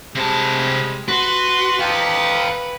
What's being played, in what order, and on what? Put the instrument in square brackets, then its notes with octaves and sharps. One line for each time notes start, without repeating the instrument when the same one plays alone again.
[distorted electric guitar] C3 A5 [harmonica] G3 G#3
[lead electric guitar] F#4 [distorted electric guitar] B4 [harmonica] C6
[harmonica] D#4 G4 A5 [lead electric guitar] F5 G5